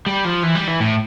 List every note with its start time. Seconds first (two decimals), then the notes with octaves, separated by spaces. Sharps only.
0.06 G3
0.25 F3
0.43 E3
0.55 G3
0.68 E3
0.80 A2